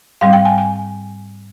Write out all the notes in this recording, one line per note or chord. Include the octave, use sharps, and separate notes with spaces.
G#2 G3 C4 F5
G5
G#5
G#5